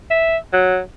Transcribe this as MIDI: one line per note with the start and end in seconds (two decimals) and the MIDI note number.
0.10 0.37 76
0.53 0.79 54